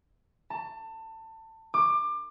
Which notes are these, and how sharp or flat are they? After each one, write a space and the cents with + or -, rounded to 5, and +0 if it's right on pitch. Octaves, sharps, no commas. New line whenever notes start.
A5 +25
D6 +25